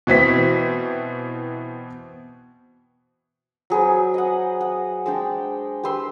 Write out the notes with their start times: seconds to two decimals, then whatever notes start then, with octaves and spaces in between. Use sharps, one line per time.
0.07 B2 E3 C4 B6
3.70 F#3 G#4 B4 C5
4.14 D#5 F#5
4.61 F#5
5.06 G#3 D4 G5
5.83 G4 B4 C6 E6